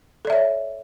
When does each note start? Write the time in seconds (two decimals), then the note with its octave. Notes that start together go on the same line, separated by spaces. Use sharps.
0.25 A4
0.27 D5
0.30 E5
0.32 C#5